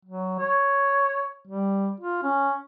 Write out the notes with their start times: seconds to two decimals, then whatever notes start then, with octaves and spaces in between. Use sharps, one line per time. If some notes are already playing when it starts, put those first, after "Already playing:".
0.05 F#3
0.39 C#5
1.47 G3
2.00 F4
2.23 C#4